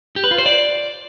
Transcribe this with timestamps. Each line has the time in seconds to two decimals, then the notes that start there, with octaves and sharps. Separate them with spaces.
0.16 G4
0.24 B4
0.31 F4
0.38 C5
0.46 D5